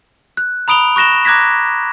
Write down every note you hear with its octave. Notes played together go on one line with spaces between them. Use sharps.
F#6
A#5 B5 D#6 D7 F7 G7
C#6 F#6 A#6 E7 G7
A#5 D6 F#6 G#6 A#6 B6